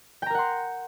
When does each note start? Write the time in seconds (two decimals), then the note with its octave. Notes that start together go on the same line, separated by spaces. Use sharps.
0.22 G5
0.26 A#5
0.30 A#4
0.35 F#5
0.39 C6